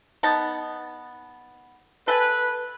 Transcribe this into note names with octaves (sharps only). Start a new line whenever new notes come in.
B3 D#4 A5
A4 B4 G#5